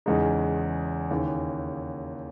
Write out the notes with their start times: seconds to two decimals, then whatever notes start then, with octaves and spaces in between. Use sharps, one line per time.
0.06 E2 C#3 G#3 D#4
1.10 D#2 C#3 E3